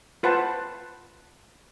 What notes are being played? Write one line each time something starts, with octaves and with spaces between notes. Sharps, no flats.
F4 B4 C5 F#5 A5